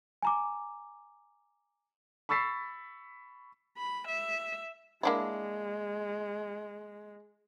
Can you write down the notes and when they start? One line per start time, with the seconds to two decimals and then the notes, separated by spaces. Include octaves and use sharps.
0.22 G#5 A#5 D6
2.29 B5 C#6 E6 A6 B6 C7
3.77 B5
4.08 E5
5.03 G#3 A#3 D4 E4